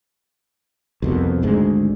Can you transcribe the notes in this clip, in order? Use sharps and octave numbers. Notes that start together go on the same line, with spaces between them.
C2 F2 B2
G#1 D2 G#2 G#3